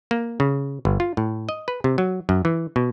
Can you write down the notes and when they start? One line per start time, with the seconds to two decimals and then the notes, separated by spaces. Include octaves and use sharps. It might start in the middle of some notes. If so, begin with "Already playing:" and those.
0.11 A#3
0.40 C#3
0.85 G1
1.00 F4
1.17 A2
1.49 D#5
1.68 B4
1.84 C3
1.98 F#3
2.29 F#2
2.45 E3
2.76 B2